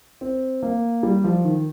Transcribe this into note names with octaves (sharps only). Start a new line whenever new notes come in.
C4
A#3
G3
F3
D#3